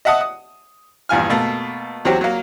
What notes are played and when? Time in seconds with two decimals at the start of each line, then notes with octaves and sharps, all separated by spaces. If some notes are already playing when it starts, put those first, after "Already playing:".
0.05 D#5 E5 F#5 A5 D#6
0.21 D#6
1.09 A#1 E2 G2 F4 G#5 F6
1.29 B2 A3 A#3
2.05 E2 F#3 C4 F#4 G4
2.21 F#3 A#3